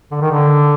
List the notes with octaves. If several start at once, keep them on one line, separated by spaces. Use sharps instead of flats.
D3
D#3
D3